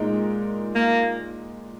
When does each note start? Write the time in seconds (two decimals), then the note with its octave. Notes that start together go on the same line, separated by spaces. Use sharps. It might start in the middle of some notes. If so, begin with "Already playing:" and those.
Already playing: A#2 G#3 D#4 A#4
0.75 A#3